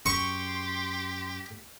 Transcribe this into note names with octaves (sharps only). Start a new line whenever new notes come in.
F#2 G4 C6 C#6